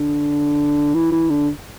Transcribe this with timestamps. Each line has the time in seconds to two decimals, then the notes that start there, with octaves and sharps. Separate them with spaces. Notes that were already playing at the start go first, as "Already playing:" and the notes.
Already playing: D3
0.94 E3
1.12 E3
1.30 D3